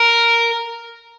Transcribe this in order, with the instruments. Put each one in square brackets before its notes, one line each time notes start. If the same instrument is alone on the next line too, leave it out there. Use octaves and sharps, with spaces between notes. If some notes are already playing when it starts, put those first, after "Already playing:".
Already playing: [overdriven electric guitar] A#4